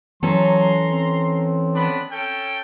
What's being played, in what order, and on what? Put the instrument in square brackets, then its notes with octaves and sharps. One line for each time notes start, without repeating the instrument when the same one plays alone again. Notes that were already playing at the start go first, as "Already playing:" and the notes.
[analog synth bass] E3 [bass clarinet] F#3 [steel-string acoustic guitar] C#4 A4 [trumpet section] A#5 C6
[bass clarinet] C4
[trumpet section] B3 D4 B5
C#4 A4 G5